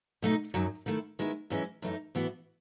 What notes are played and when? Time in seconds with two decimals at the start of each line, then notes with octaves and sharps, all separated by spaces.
0.22 B2 A3 D#4
0.54 F#2 D#3 F#3
0.86 D#3 A3 E4
1.19 D#3 G#3 B3 E4
1.50 F#2 E3 G#3 C#4 E4
1.82 F#2 E3 A3 D#4
2.15 A2 E3 B3 F#4